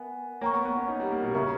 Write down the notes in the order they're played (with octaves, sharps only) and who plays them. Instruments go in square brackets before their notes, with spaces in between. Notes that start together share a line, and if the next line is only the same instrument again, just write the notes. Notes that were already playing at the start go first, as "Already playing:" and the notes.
Already playing: [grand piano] B3 [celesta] A#4 E5 G#5
[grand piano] A#3 [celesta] C#5 G5 A#5 C#6
[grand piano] B3
B3
C#4
D#4
G3
A#3
B2
[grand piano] C#3 [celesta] A#4 E5 A#5 C#6